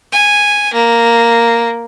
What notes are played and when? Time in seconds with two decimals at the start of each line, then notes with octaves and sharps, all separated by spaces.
0.12 G#5
0.74 A#3